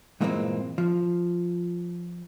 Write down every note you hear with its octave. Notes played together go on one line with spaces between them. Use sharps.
G2 A#2 E3 G#3 A#3 C4
F3